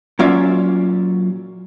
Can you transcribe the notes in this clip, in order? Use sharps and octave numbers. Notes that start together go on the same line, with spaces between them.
A#2 F#3 C#4 F4 D5 E5